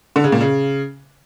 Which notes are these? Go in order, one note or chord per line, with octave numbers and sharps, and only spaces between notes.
D3
C#3
A#2
C#3